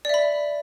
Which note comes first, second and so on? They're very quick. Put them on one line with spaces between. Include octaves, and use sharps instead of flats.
D5 E5 B5